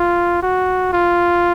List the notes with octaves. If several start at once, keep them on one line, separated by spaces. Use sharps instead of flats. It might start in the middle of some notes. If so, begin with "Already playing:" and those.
Already playing: F4
F#4
F4